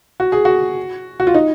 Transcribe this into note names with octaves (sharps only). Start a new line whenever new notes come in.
F#4
G#4
F#4
F#4
F4
D#4